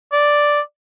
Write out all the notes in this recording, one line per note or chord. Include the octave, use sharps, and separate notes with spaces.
D5